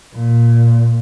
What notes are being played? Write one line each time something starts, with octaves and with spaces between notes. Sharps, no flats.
A#2